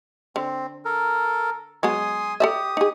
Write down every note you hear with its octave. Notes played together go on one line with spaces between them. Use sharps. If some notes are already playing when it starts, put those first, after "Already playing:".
D3 C4
A4 A#4
F#3 G#3 B3 G#5 C6 D#6
G4 A4 D5 E5 D#6
D#4 G#4